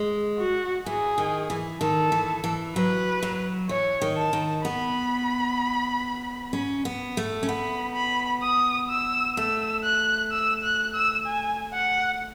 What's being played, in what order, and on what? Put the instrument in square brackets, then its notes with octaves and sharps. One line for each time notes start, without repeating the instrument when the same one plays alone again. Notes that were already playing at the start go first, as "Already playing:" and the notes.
Already playing: [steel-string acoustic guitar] G#3
[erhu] F#4
[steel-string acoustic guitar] E3 [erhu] G#4
[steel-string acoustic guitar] D#3
E3
[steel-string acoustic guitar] D#3 [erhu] A4
[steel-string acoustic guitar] E3
E3
[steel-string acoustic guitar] F#3 [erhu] B4
[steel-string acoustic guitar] F#3
[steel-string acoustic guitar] E3 [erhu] C#5
[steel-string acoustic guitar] D#3
[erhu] A5
[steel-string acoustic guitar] D#3
[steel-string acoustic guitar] B3 [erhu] B5
[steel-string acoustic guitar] C#4
B3
A3
C#4
[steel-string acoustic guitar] B3 [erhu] B5
[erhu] B5
D#6
E6
[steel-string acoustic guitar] A3 [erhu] E6
[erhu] F#6
E6
F#6
E6
G#5
F#5